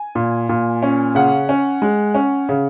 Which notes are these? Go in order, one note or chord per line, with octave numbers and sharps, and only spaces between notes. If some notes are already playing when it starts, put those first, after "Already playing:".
Already playing: G#5
A#2
A#2
C#4
C#3 F#5
C#4
G#3
C#4
C#3